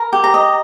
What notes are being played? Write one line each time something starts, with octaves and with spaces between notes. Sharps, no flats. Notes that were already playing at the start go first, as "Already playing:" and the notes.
Already playing: A#4
G4
A#5
D#5